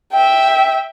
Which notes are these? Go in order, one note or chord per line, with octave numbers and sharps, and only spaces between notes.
E5 G5